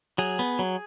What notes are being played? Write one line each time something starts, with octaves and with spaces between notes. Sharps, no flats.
F#3 G#4
B3
F#3